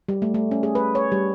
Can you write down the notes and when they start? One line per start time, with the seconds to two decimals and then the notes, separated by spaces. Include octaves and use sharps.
0.08 G3
0.22 A3
0.34 A3
0.51 C#4
0.63 G#4
0.75 B4
0.95 C#5
1.12 G3